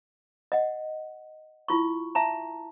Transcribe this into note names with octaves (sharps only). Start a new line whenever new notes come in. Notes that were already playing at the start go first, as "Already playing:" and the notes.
D#5 F#5
E4 F4 C#6
E5 A5 A#5